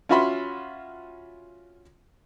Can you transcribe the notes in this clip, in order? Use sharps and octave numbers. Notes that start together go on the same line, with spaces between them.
C#4 F4 F#4 E5 B5 C6